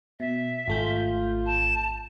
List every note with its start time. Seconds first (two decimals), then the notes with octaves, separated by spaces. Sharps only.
0.20 B2 E5
0.68 G#1 A3 C4 F4 G6
1.46 A5